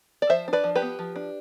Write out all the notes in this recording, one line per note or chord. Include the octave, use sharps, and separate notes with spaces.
D5
F3 C5 E5
D4
B4 D5
F3
G4 B4
B3
F3
D4